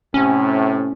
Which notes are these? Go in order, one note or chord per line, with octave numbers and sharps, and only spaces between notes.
A2 C3 C#4